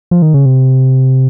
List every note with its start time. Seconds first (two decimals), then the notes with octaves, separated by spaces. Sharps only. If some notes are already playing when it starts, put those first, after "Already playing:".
0.11 F3
0.22 D#3
0.34 C#3
0.46 C3